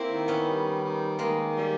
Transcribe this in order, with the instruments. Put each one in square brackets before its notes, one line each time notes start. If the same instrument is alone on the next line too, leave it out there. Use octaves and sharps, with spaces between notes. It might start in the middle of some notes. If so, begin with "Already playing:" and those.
Already playing: [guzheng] A#3 C4 [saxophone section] E4
[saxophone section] D#3
[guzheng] B3 C#4
[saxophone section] G3
D#3
[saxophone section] D#3 [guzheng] G#3 A#3
[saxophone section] G3